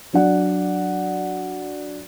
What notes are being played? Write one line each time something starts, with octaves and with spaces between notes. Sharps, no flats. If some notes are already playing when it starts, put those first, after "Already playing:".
F#3 D4 D5 F#5